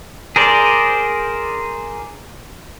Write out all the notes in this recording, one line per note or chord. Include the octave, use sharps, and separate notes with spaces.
G#4 A#4 C5 D5